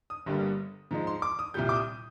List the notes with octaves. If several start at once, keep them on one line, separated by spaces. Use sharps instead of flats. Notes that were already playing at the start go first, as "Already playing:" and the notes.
D#6
G1 G2 D3 G3 A#3
G#2 F3 G#3
C6
D6
D#6
C2 A#2 G3 G6
D6
D#6